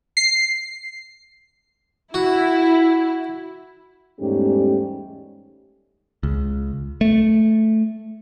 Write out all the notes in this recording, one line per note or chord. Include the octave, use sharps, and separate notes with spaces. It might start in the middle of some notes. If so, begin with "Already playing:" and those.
C7
E4 F#4
E2 G#2 G3 A3 C#4 G4
C#2
A3